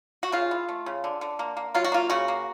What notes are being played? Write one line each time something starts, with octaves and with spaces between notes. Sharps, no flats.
F#4
C#3 F4
E3
A3
C#3
D3
D3
A#3
A#3
F#3 F4
F#4
A#3 F4
C#3 F#4
A#3